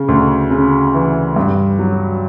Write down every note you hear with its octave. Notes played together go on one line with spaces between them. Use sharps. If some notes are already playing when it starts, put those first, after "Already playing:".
Already playing: C#3
D2
C#3
E3
G2
F#3